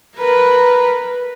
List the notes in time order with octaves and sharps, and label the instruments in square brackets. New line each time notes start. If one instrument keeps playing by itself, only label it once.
[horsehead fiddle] A#4 B4